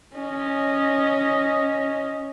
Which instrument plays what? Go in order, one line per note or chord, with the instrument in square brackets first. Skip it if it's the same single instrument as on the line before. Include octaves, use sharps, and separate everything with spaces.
[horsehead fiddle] C#4 D#5